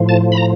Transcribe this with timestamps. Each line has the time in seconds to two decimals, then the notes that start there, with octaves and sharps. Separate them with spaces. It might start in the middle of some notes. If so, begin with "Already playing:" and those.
Already playing: A2 F3
0.09 A5
0.32 B5
0.37 A#5